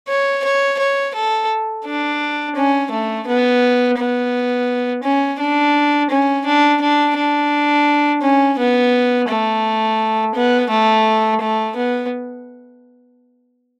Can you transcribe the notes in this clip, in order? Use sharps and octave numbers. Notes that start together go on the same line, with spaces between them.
C#5
C#5
C#5
A4
D4
C#4
A3
B3
B3
C#4
D4
C#4
D4
D4
D4
C#4
B3
A3
B3
A3
A3
B3